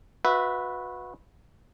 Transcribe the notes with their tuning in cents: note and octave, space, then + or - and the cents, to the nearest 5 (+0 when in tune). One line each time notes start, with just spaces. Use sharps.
F#4 -30 B4 +0 E5 -10